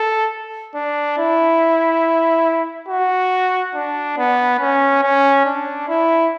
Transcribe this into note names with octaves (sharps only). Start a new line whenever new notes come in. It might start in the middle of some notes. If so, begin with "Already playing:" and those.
Already playing: A4
D4
E4
F#4
D4
B3
C#4
C#4
D4
E4